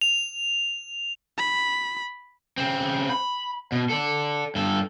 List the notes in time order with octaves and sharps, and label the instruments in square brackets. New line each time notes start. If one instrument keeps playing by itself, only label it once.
[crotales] F7
[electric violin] B5
[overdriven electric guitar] C#3 C4
B5
B2
A4 D5
G2 A4